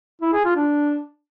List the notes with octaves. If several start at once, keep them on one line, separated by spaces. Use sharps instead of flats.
E4
G#4
F4
D4